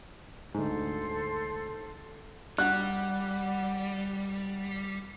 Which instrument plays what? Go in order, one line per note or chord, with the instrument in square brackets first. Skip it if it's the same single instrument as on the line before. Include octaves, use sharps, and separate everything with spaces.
[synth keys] D2 G#2 [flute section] A4 C5
[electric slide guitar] G3 [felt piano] F#5 F#6